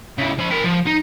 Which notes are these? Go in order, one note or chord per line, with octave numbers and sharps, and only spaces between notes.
C#3 E3
F3 B5
E4 A#4
F3
D#4